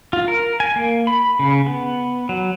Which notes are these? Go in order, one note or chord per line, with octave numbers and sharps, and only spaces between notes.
F4
A#4
G#5
A#3
B5
C#3
B3
F#3